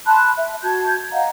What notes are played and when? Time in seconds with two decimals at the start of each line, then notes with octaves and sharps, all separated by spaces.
0.06 A5 B5 C6 F#6
0.37 E5
0.63 F#4 A5 G6 G#6
1.12 D#5 F5 F#5 A#5